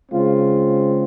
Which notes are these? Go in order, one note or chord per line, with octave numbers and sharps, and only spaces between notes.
C#3 G#3 C4 F4